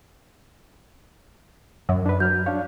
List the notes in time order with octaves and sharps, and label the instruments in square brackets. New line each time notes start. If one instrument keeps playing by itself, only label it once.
[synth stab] F#2
[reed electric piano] D4 B4
[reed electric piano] F#3 F6 [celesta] G6
[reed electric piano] D4 C#5 [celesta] F5